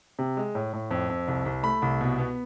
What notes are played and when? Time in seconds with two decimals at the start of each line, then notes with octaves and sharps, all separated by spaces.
0.19 C3
0.37 G#3
0.55 A2
0.73 A2
0.91 F2
1.09 F2
1.28 C2
1.46 C2
1.63 A3 B5
1.82 C2
2.01 B2
2.18 B3